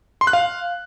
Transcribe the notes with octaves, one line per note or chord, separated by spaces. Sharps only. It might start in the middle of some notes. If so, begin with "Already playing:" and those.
C6
F#6
F5